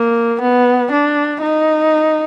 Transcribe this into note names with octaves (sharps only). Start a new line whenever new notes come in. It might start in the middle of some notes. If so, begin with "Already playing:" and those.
Already playing: A#3
B3
D4
D#4